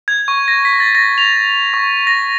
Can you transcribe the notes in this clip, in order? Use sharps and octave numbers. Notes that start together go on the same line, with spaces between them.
G#6
C#6
A#6
B6
A6
A#6
F7
C#6
A#6